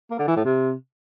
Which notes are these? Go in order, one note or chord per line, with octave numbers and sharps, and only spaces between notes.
A#3
D3
E3
A2
C3